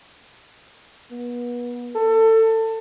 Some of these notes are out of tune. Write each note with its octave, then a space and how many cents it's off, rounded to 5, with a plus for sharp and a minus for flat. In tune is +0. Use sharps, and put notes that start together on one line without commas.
B3 -30
A4 +25